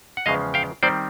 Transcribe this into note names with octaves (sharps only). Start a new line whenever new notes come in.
F#5
E2 C#3 F3 G#3 D#5 F5
F5 G5
D#3 G3 C4 C5 D5